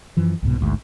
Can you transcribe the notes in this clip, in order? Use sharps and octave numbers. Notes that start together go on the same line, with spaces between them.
F#2 E3 F3
C2 G#2 B2
A1 D2 G#2